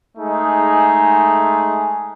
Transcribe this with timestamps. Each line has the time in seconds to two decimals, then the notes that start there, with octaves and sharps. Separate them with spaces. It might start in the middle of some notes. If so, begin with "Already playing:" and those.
0.18 G#3 A3 D#4 G#4